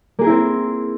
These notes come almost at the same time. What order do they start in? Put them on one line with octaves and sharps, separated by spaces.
A#3 G#4 A#4 E4 C4